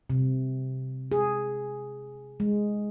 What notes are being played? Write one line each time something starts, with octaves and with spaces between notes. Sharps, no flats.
C3
G#4
G#3